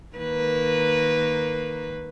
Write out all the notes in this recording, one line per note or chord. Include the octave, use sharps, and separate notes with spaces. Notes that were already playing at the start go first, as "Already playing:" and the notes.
D#3 A#3 B4